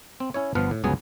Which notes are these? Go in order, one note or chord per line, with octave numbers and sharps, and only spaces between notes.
C4
C#4 E4 C#5
G1 F3 B3 B4 F5 F#5
A2
G1 C#2 F#3 B3 G#4